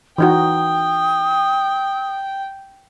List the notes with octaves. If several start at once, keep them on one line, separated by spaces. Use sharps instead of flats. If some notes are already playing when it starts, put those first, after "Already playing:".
E3 D#4 F#4 G5 D#6